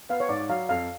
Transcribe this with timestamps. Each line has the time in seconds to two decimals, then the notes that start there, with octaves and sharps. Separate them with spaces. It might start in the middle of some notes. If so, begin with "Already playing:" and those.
0.09 B3 F5
0.20 C#5
0.29 G#2 D5
0.49 F#3 F5
0.69 F2 F5